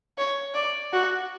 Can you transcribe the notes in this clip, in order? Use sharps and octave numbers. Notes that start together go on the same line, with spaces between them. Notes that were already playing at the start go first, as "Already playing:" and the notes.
C#5
D5
F#4